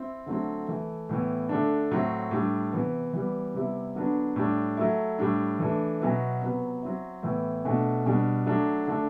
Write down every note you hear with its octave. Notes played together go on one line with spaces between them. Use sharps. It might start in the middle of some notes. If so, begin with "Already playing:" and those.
Already playing: C4 E4
D3 F#3 A3 C4
E3 A3 E4
A2 E3 B3
D3 A3 D4
A2 F#3 C4 E4
A2 G3 D4
C3 E3 B3
E3 G3 B3
C3 G3 B3 E4
D3 F#3 B3 D4
A2 G3 D4
F#3 A3 E4
A2 G3 D4
E3 A3 D4
B2 F#3 B3 E4
C3 F#3 B3
F#3 C4 E4
A2 E3 B3 E4
B2 A3 D4
B2 G3 D4
F#3 A3 D4
D3 A3 D4